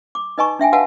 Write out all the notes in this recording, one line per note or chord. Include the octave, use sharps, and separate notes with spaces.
D6
D#4 B4 D#5 G#5 A#5 C#6
D4 E5 G5 G#5
F#4 B4 F5 F#5 G#5 A5